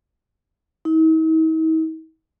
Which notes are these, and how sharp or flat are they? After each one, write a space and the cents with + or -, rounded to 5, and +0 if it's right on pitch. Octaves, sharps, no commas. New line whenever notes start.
D#4 +45